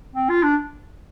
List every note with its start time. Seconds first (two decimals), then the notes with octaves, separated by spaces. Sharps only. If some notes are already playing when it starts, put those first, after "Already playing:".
0.15 C4
0.29 F4
0.43 D4